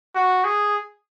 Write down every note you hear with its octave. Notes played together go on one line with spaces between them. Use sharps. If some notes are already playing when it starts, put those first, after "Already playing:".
F#4
G#4